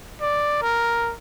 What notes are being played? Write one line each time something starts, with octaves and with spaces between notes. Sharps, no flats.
D5
A#4